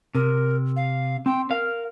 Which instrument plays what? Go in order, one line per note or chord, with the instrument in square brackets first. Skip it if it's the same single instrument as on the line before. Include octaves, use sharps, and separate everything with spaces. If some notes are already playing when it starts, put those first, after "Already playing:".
[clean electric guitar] C3 [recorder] A#4
[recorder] F5
[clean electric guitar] C4 [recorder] G5
[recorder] A#4 [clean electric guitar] F5